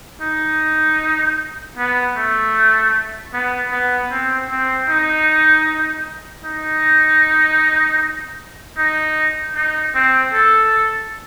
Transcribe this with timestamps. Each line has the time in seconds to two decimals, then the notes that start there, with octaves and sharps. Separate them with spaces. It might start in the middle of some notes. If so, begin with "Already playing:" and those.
0.22 D#4
1.77 B3
2.16 A3
3.33 B3
3.72 B3
4.11 C4
4.50 C4
4.89 D#4
6.44 D#4
8.78 D#4
9.56 D#4
9.95 C4
10.33 A4